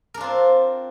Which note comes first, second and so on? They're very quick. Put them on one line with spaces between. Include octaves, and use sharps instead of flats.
A#4 D4 F4 C4